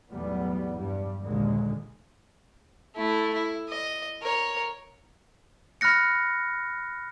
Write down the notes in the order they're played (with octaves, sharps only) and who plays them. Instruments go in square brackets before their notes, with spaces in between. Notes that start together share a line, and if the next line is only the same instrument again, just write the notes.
[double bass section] B1 E2 A2 G3 B3
G2 G3
A#1 D#2 A#2 D3 G#3
[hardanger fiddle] A3 E4
E4
D#5
A#4 C#5
[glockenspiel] B5 F6 F#6 A#6 C#7